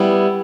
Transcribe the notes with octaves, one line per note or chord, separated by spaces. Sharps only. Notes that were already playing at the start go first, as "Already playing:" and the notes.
Already playing: G3 B3 E4